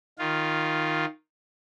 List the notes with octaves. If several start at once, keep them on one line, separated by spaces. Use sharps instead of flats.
D#3 F4